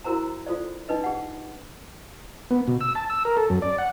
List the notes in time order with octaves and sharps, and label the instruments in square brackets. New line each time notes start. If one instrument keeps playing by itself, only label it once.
[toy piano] E4 F#4 A#4 C5 A#5
F4 A4 C5 D5
D4 D#4 B4 D#5
G4 F#5
[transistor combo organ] B3
B2
E6
A5
E6
A#4
A4
F#2
D5
F#5